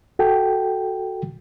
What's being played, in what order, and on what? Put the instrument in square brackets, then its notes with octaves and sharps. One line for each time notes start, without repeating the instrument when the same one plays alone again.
[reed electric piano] F#4 A4 G5